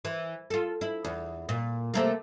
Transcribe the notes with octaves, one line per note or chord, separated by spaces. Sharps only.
E3
F4 A4
E4
E2
A#2
C3 A3 A#3